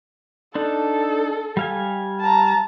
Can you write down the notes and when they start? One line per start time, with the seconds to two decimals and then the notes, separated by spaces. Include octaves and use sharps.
0.55 D4 D#4 A4
1.57 G3 F5 G#5
2.20 A5 A#5